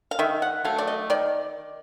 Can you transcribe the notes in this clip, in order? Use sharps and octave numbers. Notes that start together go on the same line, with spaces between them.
F5
D#3 E5
F#5
F#3 A3 F5
D5
D#5
D#3 D5